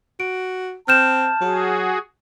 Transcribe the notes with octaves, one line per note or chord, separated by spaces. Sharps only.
F#4 D7
C4 A5 F6 G6 E7
F#3 F#4 G#4